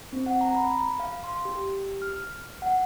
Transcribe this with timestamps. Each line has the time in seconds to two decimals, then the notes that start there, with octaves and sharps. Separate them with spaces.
0.13 C4
0.26 F#5
0.41 A#5
0.56 B5
1.00 F5
1.24 C6
1.45 G4
2.02 F6
2.62 F#5